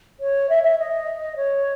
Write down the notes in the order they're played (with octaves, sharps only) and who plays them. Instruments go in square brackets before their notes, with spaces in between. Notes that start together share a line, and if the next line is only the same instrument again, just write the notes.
[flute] C#5
E5
E5
D#5
C#5